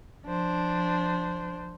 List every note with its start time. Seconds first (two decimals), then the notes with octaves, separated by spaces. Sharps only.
0.25 F3 D4 C5